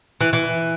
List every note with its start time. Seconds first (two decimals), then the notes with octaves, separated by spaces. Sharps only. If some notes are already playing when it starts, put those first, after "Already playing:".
0.21 E3
0.33 E3